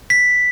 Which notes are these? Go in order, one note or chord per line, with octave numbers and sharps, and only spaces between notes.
B6